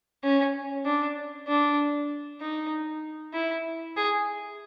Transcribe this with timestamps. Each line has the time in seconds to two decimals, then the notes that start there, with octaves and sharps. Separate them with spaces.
0.24 C#4
0.85 D4
1.48 D4
2.41 D#4
3.34 E4
3.96 G#4